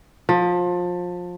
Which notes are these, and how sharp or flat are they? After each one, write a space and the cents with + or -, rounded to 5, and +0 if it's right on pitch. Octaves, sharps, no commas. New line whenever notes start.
F3 +25